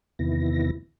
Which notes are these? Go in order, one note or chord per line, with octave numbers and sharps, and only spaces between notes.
E2 C3 D#3 B3 E4 A#6